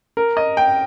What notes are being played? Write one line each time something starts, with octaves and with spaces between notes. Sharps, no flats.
A#4
D#5
G5